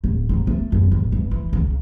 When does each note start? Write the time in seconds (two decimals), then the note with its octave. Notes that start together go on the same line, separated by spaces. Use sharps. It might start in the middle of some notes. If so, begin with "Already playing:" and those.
0.04 D1
0.29 G#2
0.47 A3
0.72 F#2
0.92 D1
1.12 G2
1.31 E3
1.53 C#2